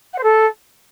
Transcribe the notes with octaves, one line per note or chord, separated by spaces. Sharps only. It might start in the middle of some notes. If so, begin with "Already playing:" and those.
F#5
C5
A4